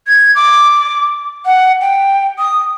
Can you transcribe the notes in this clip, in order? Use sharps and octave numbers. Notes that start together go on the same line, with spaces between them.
G#6
D6
F#5
G5
D#6